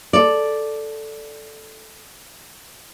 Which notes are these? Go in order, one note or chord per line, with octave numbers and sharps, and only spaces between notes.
A4 D5